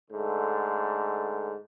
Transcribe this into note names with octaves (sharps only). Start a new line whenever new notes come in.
G#2 D3 A3